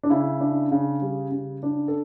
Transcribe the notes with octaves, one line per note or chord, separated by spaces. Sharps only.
D4
C#3 E4
D4
C#3
G3
C#3
D4
A4